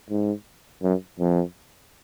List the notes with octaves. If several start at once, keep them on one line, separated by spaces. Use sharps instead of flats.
G#2
F#2
F2